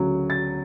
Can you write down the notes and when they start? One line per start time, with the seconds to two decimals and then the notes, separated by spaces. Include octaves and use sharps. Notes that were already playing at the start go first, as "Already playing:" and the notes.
Already playing: D2 C#3 F#3
0.30 A6